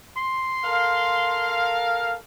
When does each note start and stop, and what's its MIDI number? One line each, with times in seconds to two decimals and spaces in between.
0.18 1.74 84
0.65 2.16 69
0.65 2.16 70
0.65 2.16 77